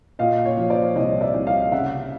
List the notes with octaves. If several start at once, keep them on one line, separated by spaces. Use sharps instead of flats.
A#2 D#5 F5
C#5
F3
C5 D5
C2 C#5 D#5
D5 E5
C2
D#5 F5
C#3 E5 F#5